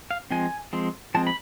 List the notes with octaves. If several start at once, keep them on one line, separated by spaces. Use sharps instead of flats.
F5
F3 G#3 C4 G#5
F3 G#3 C4
F3 G#3 C4 A5
B5